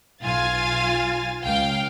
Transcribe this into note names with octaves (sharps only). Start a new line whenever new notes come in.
B1 F4 F5 G#5 A6
C#2 F5 G5